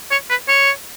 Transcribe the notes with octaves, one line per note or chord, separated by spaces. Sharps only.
C#5
B4
C#5